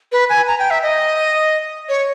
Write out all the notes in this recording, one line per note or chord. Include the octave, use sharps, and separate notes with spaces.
B4
G#5
A#5
G5
E5
D#5
C#5